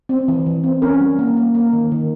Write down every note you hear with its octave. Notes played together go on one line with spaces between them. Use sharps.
C4
E3
E3
C4
C#4 A#4
G3
A#3
A#3
A#3
D#3
D#3